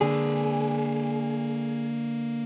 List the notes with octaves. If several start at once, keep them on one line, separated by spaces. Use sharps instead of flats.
D3 A#3 G#4 B4